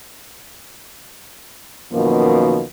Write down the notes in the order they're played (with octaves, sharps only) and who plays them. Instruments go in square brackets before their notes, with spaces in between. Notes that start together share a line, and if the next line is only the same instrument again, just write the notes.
[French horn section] F#2 B2 D#3 F3 A#3